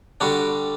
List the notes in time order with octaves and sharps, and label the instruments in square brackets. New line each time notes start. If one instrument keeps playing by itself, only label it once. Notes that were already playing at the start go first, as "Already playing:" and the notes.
[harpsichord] D3 G3 D4 F#4